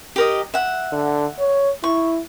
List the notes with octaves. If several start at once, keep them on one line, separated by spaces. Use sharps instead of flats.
G4 A#4 D#5
E5 F#5
D3
C#5
E4 C#6